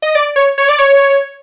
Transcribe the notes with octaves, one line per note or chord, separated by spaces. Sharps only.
D#5
D5
C#5
C#5
D5
C#5